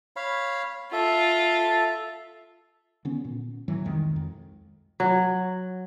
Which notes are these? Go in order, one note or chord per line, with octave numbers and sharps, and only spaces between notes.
C#5 F5 B5
F4 A4 E5
D3 B3 C#4
A#2
A2 E3 F#3
C2 F2 D#3 G#3
F2
F#3